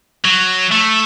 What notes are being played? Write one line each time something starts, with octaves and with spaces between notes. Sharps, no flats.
F#3
A3